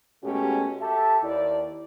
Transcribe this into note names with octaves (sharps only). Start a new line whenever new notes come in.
B2 G#3 A3 C#4 F#4 G4
G4 A4 E5 A5
D#2 E4 D5